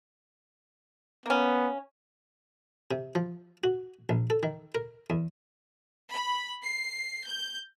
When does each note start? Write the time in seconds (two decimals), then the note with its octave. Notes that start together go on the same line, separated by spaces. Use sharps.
1.26 A#3 B3 C#4
2.91 C3
3.15 F3
3.64 F#4
4.09 A#1
4.30 A4
4.43 D#3
4.75 A#4
5.10 E2
6.09 B5
6.62 C7
7.25 G6